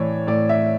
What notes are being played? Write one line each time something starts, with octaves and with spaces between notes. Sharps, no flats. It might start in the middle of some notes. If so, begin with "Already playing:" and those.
Already playing: A2 E3 C#5 D5
A2 D5
E5